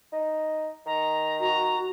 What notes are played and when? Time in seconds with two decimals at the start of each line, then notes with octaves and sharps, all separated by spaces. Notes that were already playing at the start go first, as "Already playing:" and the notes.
0.12 D#4
0.86 D#3 A#5
1.40 F#4 A#5